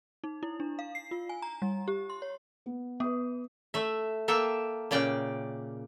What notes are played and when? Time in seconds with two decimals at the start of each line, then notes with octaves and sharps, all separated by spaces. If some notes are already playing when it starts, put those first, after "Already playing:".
0.24 D#4
0.43 E4
0.60 D4
0.79 F5
0.95 C7
1.11 F4
1.29 G#5
1.42 A#5
1.62 G3
1.88 G4
2.10 C6
2.22 C#5
2.66 B3
3.00 B3 B4 D#6
3.74 A3 E5
4.28 A#3 A4 E5 G5
4.91 A#2 C#3 D5 G5